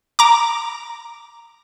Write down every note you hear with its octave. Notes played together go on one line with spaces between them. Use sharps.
A#5 D6